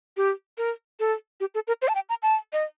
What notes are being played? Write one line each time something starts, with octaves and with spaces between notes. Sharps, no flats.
G4
A#4
A4
G4
A4
A#4
C5
A5
G5
A#5
A5
D#5